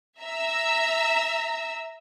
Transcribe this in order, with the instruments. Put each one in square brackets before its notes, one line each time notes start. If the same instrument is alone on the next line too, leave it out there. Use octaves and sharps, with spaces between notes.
[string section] E5 A#5 E6